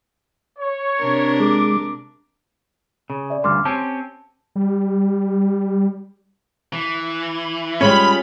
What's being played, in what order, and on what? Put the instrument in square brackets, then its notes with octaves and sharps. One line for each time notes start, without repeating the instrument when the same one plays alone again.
[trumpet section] C#5
[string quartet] C3 D4 A#4
[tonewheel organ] G#3 [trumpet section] D6
[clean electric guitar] C#3
[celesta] D5 E5
[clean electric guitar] D2 G2 C#3 [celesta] C6 D6 F6
[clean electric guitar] C4 C#4 G4 [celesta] A5
[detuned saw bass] G3
[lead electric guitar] E3
[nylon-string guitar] G3 G#3 C#5 [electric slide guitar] C#4 F4 [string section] B5